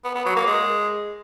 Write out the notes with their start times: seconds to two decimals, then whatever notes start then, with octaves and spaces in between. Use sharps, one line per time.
0.04 B3
0.15 B3
0.26 F#3
0.36 A#3
0.47 G#3